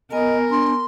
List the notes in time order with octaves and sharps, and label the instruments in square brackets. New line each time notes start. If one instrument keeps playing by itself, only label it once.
[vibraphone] B3 G#5 [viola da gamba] A#4 [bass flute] D#5
[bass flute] D4 [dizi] C6